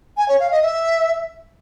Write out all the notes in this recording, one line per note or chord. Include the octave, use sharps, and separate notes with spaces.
G#5
C#5
F5
D#5
E5